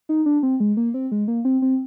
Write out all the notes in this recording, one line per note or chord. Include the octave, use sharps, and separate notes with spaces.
D#4
D4
C4
G#3
A#3
C4
G#3
A#3
C4
C4